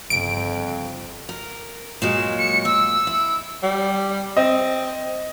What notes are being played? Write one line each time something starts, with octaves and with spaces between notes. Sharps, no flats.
G1 F2 C#3 D7
A#4
A#2 F#3 G#3 E7
C#7
A#2 E6
E4
G3
C4 D#5